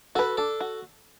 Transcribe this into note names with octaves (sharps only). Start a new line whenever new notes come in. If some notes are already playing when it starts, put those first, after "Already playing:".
F#4 A4 B4
D4 A4
F#4